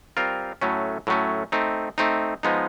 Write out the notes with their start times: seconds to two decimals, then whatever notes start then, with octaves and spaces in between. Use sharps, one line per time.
0.17 G3 C4 F4 A#4
0.62 A2 F#3 A3 C#4
1.07 A2 F#3 A3 C#4
1.52 A3 C4 D#4
1.98 A3 C4 D#4
2.43 F3 G#3 B3 D#4